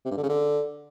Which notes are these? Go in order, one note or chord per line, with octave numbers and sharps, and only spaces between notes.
C3
G2
D3
C#3
D3